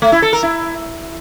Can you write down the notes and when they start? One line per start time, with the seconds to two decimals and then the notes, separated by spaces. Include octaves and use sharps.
0.02 A3
0.12 E4
0.22 A4
0.33 A#4
0.43 E4